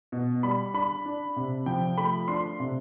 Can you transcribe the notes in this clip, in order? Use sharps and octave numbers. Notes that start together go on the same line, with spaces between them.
B2
G3 B5
D4 B5
D4
C3
F3 G5
A3 B5
D4 C6
C3